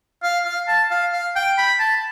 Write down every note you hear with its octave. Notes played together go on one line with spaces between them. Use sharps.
F5
F5
A5
F5
F5
G5
B5
A5